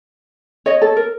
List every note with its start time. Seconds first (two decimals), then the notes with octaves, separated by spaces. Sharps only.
0.66 C#5 D#5
0.82 A4
0.97 A#4